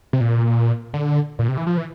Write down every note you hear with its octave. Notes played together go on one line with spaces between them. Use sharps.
C3
A#2
D3
A#2
C3
E3
F3
E3